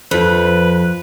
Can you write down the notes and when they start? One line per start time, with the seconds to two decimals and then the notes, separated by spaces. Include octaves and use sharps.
0.11 F2 F4 B4 C5